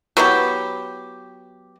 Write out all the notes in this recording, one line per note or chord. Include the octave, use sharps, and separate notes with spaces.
F#3 B3 E4 G4